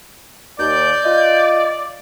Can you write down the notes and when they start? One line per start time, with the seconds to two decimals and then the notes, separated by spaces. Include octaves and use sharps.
0.59 D#2 D5 G6
1.04 F4 D#5